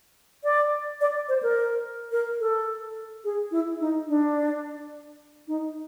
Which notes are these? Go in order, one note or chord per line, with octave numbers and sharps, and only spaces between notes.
D5
D5
C5
A#4
A#4
A4
G#4
E4
D#4
D4
D#4